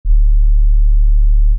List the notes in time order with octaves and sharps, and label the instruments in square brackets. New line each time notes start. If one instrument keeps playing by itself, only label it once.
[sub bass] D1